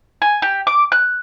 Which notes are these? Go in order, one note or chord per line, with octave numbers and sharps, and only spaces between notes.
G#5
G4
D6
F#6